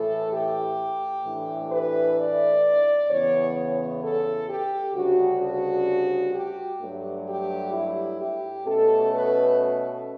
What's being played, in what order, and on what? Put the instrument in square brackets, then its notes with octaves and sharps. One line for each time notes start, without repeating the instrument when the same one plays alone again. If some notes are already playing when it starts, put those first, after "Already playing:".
Already playing: [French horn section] A2 E3 A3 A4
G4
A2 E3 A3 D4
B4
D5
E2 C#3 E3 B3 C#5
C#5
A4
G4
D2 C#3 G3 D4 F#4
F#4
G4
G2 F#3 A3
G4
E4
G4
B2 A3 C#4 A4
B4